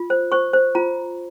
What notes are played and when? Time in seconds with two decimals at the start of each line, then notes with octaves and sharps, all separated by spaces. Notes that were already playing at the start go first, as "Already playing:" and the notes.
Already playing: F4
0.10 C5
0.32 C5 C#6
0.53 C5
0.75 F4 A#5